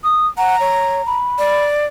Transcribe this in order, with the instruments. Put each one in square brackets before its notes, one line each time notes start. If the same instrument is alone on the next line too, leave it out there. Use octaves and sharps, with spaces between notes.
[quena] D#6
[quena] F#5 [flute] A#5
[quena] C#5
B5
[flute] D5